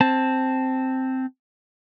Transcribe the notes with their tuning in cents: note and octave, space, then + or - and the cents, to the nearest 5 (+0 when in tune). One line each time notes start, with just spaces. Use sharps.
C4 +0 A5 +0